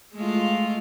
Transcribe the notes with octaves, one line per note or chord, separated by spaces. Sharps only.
G#3 A3 F4